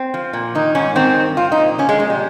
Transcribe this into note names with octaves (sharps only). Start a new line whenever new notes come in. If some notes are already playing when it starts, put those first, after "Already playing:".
Already playing: C4
F3
A#2
D#3 D#4
G#2 C#4
D#3 C4
G2
F3 F4
D#4
A#2
F3 C#4
G#3
A#2 G#3
G3